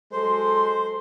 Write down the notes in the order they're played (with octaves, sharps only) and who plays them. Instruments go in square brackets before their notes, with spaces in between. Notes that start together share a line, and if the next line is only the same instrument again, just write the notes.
[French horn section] F#3 G#3 A4 [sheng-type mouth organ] C5 [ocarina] C6